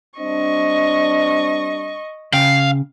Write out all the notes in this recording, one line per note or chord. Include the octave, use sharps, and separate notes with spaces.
G3 C4 D4 D#5 C#6
C#3 F5 G5